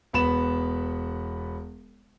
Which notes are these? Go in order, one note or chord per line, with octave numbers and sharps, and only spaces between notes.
E1 B3 B5 E7